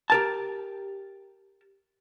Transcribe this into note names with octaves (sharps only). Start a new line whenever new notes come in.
G4 A#4 A5